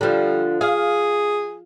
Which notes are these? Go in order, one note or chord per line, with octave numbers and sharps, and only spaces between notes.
D3 F3 G3
G#4 F5